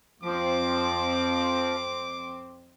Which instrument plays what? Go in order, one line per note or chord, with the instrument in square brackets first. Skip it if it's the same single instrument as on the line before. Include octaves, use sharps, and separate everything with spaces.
[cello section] F2 C4 [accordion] F3 [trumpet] D6